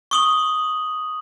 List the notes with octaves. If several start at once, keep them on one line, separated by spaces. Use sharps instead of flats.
C#6 D#6 F#7